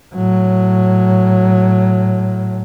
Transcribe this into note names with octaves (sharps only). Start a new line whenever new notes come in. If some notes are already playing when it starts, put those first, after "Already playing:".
A2 F#3